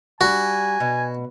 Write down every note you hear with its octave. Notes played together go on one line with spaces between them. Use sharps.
G3 D4 F#4 G#5
B2